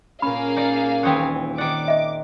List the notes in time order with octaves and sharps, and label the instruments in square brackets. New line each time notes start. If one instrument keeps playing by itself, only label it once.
[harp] A#2 C#4 [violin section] A#3 G#4 F5 [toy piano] B5
[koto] D#4 D5
[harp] D#1 D#6 [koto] E3 C4 C#5 [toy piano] C#4 G5
[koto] D#3 F#5 [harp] G#4 D5 [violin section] D6
[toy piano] D#5 E5